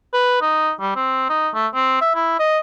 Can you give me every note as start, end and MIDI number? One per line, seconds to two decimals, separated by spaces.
0.14 0.38 71
0.41 0.71 63
0.80 0.93 55
0.96 1.28 60
1.29 1.49 63
1.54 1.67 57
1.75 2.00 60
2.01 2.14 76
2.15 2.36 64
2.39 2.59 75